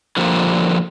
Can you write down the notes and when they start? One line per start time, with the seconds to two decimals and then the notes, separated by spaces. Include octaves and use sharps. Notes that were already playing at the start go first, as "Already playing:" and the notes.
0.17 D3 F3 G3 A#3